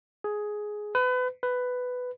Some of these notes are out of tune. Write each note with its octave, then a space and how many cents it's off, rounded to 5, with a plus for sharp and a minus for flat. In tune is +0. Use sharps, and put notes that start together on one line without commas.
G#4 +10
B4 +30
B4 +10